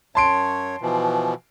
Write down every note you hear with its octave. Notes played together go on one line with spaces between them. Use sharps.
F#2 C#5 A5 C6 D7
B2 E3 F3